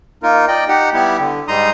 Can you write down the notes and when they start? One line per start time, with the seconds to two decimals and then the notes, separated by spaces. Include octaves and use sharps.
0.23 A#3 D#4 F4 A#4
0.48 D5 D#5 G5
0.68 D#4 G4 F#5
0.93 G3 B3 E4 G4
1.19 D3
1.48 G#2 G3 D#4 A#5 C6 D#6